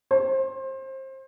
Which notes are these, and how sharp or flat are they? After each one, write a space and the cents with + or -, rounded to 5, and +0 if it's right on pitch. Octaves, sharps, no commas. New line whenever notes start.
C5 +25